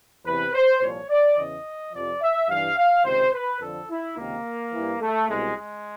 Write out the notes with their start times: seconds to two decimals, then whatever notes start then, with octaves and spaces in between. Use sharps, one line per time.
0.26 E2 C3 E3 B4
0.54 C5
0.81 C2 A#2 F3 C#5
1.09 D5
1.37 E2 C#3 E3 D#5
1.93 F2 C3 F3 D5
2.21 E5
2.49 G2 E3 F5
2.77 F5
3.05 C#2 C3 D#3 C5
3.33 B4
3.61 F2 D3 F3 A4
3.90 E4
4.18 C#2 C3 D#3 A#3
4.73 G2 E3
5.01 A3
5.29 C2 B2 G#3
5.57 G#3